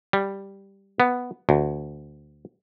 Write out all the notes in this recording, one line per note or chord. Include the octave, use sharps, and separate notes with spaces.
G3
B3
D2